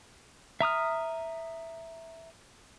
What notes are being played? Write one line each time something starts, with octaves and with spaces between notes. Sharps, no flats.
E5 A#5 D#6 F6